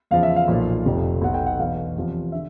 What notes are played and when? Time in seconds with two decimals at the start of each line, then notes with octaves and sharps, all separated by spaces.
0.11 E2 C#3 F3 F5
0.23 E5
0.36 F5
0.48 B1 A#2 F3
0.85 F1 F2 C3 F3
1.21 B1 B2 F#5
1.34 G5
1.46 F#5
1.59 E2 B2 F5
1.96 E2 C3 F3
2.32 D3 E5